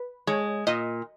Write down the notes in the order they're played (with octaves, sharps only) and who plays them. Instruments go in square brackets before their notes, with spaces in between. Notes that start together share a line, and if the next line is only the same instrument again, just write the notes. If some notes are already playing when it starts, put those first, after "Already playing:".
Already playing: [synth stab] B4
[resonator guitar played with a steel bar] G#3 [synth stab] C#5
[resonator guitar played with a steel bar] A#2 [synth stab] D#5